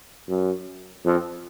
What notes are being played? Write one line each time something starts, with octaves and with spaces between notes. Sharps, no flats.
F#2
F2